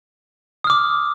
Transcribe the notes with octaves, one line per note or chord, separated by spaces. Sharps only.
D6 D#6 F6